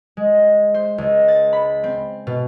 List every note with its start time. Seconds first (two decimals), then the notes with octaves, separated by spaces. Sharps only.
0.17 G#3
0.74 C5
0.98 C#2
1.28 A6
1.53 B5
1.84 C4
2.27 B2